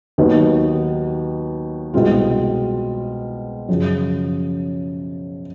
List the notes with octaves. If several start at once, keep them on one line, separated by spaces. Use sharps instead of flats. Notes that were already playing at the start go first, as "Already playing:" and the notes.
D#2 D#3 F#3 B3
C2 B2 G#3 C4 F4
F#2 C#3 F3